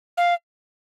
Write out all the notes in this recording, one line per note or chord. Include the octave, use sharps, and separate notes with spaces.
F5